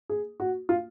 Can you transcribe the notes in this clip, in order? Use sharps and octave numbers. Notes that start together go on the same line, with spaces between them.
G#4
F#4
F4